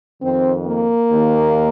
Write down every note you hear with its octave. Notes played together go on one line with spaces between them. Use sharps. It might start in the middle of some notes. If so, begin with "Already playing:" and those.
F2 D#3 C4
A#3
D#2 D#3